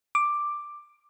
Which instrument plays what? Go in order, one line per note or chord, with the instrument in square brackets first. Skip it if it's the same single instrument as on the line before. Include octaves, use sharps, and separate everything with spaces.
[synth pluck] D6